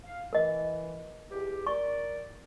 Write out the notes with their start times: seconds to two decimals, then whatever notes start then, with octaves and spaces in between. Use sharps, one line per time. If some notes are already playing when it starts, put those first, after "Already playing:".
0.04 F5
0.33 E3 A#4 D#5
1.31 E2 G4
1.67 D4 A#4 D5 C#6